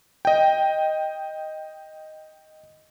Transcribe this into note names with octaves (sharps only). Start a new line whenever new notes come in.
D#5 G5